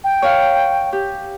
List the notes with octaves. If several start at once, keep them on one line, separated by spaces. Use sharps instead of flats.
G5
C#5 F5
G4